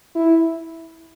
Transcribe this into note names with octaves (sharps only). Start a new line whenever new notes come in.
E4